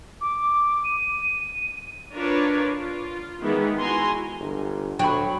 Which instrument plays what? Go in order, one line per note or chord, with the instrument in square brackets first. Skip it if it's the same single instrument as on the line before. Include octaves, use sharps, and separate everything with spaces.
[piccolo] D6
D#7
[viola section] D4 F4 A#4 B4 C#5 D5
F4
D#3 E3 G#3 B3
E4 F#4 G#5 A#5 C6
[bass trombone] G1
[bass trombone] D2 [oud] F#3 [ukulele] G5 B5